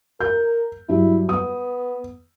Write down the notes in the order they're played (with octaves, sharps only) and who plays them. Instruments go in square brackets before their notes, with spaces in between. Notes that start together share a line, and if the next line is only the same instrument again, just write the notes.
[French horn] A#4 [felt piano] G6
[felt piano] G2 F#3 [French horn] E4
[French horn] B3 [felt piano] D#6